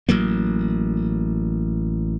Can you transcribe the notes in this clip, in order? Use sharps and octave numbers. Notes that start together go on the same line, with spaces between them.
A1 F#3 A#3